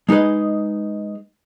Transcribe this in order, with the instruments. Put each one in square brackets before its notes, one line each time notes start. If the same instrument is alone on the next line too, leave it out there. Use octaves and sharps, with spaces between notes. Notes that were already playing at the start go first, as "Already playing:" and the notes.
[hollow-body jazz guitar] G#3 D#4 G#4 B4 D#5